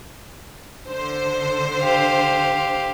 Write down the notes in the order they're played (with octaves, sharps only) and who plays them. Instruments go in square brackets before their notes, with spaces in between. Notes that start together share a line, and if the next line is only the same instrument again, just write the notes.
[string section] D3 C5
[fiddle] G4 F5